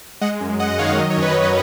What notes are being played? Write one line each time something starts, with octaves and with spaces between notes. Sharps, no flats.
G#3 D#5 F#5
F#2
F#2 D#5 F#5
D#3 C#5 F5
F#3 D#5
C#5
F#2 B4 D#5
F#2